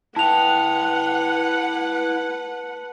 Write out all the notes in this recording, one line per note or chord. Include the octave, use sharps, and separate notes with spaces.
E4 B4 F#5 G5 A5 F7